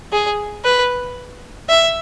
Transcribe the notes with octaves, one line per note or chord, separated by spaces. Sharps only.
G#4
B4
E5